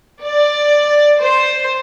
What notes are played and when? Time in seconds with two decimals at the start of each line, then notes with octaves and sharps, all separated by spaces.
0.22 D5
1.20 C5